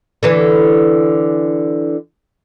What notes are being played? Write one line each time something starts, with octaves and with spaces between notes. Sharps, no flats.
D3 E3 B4